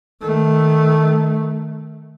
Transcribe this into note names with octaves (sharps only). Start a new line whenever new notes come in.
D#3 A3